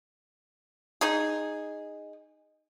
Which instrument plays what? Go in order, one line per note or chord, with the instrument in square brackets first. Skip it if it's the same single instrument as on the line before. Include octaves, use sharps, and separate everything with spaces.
[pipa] D#4 G#4